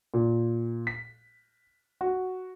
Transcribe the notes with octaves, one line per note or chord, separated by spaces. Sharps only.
A#2
B6
F#4